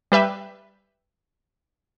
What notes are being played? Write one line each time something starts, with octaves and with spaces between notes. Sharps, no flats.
G3 B4 E5 G5